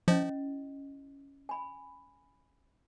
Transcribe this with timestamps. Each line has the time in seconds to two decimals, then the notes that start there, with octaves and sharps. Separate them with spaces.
0.08 F3 C#4 E4 D#5
1.49 G#5 B5